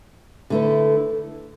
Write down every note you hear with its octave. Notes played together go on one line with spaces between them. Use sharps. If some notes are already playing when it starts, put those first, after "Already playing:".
D3 A3 E4 B4